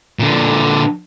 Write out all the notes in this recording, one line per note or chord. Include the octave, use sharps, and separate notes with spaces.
A#2 D3